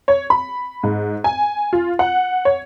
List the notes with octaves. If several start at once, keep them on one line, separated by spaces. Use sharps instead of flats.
C#5
B5
G#2
G#5
F4
F#5
C#5